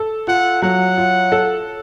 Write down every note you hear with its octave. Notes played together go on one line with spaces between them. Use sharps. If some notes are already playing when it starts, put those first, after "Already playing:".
Already playing: A4
F4 F#5
F#3 F#5
F4
A4